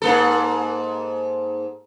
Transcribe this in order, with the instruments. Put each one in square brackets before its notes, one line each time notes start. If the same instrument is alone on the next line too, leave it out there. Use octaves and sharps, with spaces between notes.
[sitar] G#2 A#3 A4